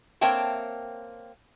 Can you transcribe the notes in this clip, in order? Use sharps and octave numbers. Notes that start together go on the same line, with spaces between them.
A#3 C4 C#5 E5 G5 A5